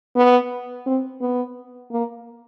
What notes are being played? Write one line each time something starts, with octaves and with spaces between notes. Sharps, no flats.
B3
C4
B3
A#3